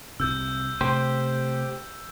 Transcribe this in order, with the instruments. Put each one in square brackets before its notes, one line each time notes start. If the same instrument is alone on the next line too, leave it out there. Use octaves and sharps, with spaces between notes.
[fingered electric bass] C2 C3 [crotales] E6 G6
[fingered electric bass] C3 A3 [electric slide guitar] G4 C5